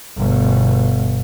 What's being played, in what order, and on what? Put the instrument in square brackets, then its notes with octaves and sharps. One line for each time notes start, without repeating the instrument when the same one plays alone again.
[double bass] G1 B2